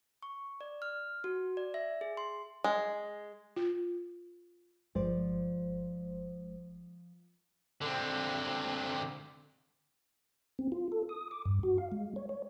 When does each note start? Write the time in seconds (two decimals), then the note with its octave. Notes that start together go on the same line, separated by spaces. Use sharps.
0.22 C#6
0.61 D5
0.82 F6
1.24 F#4
1.57 D5
1.74 E5
2.01 G#4
2.17 C6
2.64 G#3
3.56 F4
4.95 G1 F3 G#3 C5 D5
7.82 D3 C4
10.59 C4
10.72 F4
10.92 A4
11.09 D#6
11.31 D6
11.46 G2
11.63 F#4
11.78 F5
11.92 G#3
12.16 C#5
12.29 C#5